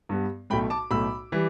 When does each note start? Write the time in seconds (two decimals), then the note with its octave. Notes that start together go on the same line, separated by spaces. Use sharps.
0.09 G2 G3 B3
0.50 B1 A2 A3 G5 B5
0.70 A5 D6
0.91 B1 A2 A3 B5 E6
1.32 E3 G3